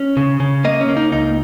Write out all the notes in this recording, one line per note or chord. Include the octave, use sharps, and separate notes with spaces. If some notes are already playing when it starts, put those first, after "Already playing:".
Already playing: C#4
C#3
C#3
A#3 D#5
C#4
A#3
D#4
C#2 D#4